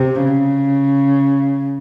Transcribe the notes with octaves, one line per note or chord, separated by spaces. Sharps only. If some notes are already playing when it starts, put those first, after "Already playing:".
Already playing: C3
C#3